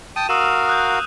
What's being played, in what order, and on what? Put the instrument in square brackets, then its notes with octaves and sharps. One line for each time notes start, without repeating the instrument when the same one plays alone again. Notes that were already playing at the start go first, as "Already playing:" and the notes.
[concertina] G5 A5 D#6 [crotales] D#7
[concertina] F#4 A#4 F5 [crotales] D#6 E6 E7
[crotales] D#6 F#6 G6